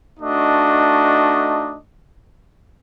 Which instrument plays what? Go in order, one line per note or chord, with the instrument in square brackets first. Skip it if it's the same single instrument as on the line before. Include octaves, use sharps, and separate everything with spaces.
[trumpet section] A3 D4 D#4 F#4 D#5